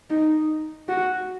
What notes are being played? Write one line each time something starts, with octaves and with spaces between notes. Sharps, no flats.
D#4
F#4